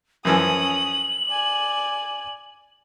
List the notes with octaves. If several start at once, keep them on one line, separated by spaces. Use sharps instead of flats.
F#2 E3 F3 C#4 D#6 F#7
D5 G#5